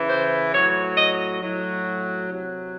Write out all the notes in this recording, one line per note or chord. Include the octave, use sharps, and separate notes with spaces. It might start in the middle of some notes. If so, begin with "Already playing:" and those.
Already playing: C#3 E3
C5
A2 F#3 C#5
D#5
A2 F#3
C3 F#3